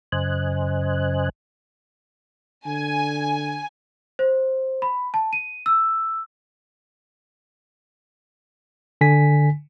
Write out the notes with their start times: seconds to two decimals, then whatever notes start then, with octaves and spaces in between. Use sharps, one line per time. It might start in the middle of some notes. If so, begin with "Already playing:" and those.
0.12 F#2 C#3 C5 D#5 G#5 F#6
2.66 D3 G#5
4.19 C5
4.82 B5
5.14 A5
5.33 D#7
5.66 E6
9.01 D3 G#5 B6